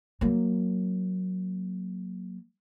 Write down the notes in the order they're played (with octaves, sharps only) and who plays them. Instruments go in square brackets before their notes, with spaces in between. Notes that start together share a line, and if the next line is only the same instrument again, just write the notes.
[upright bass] F#3 A#3